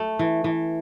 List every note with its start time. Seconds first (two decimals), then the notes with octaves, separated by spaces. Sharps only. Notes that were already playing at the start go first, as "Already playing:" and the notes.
Already playing: A3
0.19 E3
0.44 E3